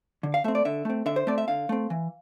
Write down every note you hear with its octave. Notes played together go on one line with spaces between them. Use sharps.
D3
F5
A3 C4 E5
D5
D3 E5
A3 C4
D3 E5
C5
A3 C4 D5
E5
D3 F5
A3 C4
E3